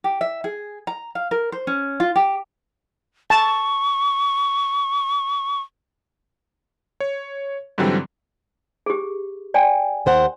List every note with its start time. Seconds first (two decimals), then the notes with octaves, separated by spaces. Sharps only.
0.04 G4
0.21 E5
0.44 G#4
0.87 A#5
1.15 F5
1.31 A#4
1.52 C5
1.67 C#4
2.00 F4
2.16 G4
3.30 A5 C#6
7.00 C#5
7.78 G#2 D3 E3 F#3 G3 C4
8.86 G4 G#4
9.54 D5 G5 G#5
10.06 D#2 C5 F#5